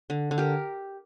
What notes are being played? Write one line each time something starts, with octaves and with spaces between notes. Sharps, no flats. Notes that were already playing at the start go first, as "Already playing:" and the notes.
D3
D3
G4 A#4